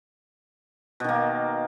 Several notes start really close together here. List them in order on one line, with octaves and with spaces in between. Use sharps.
B2 D#3 A#3